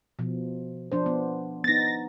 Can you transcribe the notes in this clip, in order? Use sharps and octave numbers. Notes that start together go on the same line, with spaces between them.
B2 F3
F3 D4 C5
B3
B3 D#4 A6 A#6